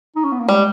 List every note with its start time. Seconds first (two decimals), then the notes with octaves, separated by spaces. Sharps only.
0.16 D#4
0.24 C#4
0.32 B3
0.40 A#3
0.48 G3 G#3